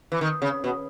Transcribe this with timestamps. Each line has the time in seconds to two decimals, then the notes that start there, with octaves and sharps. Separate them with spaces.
0.12 E3
0.21 D#3
0.42 C#3
0.64 B2